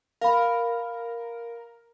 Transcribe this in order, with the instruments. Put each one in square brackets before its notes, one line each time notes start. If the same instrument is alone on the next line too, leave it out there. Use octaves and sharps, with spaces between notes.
[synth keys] A#4 [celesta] F5 B5